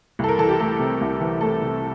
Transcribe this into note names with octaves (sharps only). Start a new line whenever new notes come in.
C2 A4
A#4
E3 A4
G4
A3 A4
C3
C2
E3
A3 A4
C3